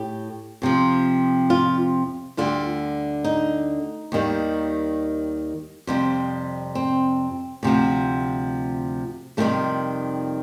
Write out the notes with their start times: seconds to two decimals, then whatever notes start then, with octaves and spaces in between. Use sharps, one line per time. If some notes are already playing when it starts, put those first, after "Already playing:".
Already playing: A2 G4
0.62 F2 C3 F3
1.50 F4
2.37 D2 D3 G3 F4
3.24 D#4
4.12 D#2 D#3 G3
5.87 F2 C3 G3
6.75 C4
7.63 D2 C3 F3
9.37 F2 C3 D#3 G3 A3